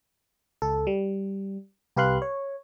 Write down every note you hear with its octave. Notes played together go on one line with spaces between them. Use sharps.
C#2 A4
G3
C2 G4 B4 F5 C6 F#6
C#5